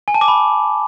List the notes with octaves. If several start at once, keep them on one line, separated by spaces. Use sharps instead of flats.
G#5
A5
D6
B5